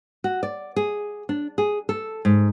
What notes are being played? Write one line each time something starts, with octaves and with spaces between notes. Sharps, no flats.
F#4
D5
G#4
D4
G#4
A4
G#2